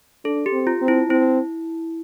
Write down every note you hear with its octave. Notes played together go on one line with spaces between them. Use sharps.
D4 A4
G4
C4
F4
C4
E4
C4 E4